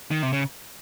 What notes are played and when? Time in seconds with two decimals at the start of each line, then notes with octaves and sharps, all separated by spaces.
0.11 D#3
0.23 C3
0.33 C#3